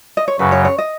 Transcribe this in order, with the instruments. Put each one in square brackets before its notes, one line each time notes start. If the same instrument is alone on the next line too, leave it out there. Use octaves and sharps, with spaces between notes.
[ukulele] D#5
C#5
[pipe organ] F#2 C#3 F#3 [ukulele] B4
[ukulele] C#5
C#5
D#5